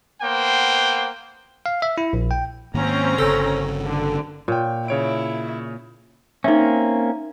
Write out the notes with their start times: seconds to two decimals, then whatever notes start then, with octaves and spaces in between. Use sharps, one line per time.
0.22 A#3 B3 C5 F#5 G5
1.66 F5
1.82 E5
1.98 E4
2.13 A#1
2.31 G5
2.74 G#2 D#3 A#3 C4 C#4 A#5
3.18 G1 C#3 A4
3.85 D3
4.48 A#2 C#5 G5
4.88 C#3 E4 C#5 D7
6.44 A#3 C4 C#4 D#4 E5